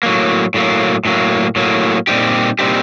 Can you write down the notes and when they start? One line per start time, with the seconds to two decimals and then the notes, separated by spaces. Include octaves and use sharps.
0.03 A2 F#3 A#3
0.54 A2 F#3 A#3
1.05 A2 F#3 A#3
1.56 A2 F#3 A#3
2.07 A#2 G3 C4 D#4 G4
2.59 A#2 G3 C4 D#4 G4